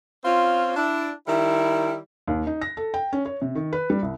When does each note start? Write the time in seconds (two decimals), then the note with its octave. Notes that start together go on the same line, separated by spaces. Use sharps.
0.25 C4 C#4 F4
0.76 D4 E4
1.27 D#3 G3 E4
2.27 D#2
2.47 D#4
2.62 A#6
2.77 A4
2.94 G5
3.13 C#4
3.26 C#5
3.42 C3
3.55 D#3
3.73 B4
3.90 G3
4.02 C2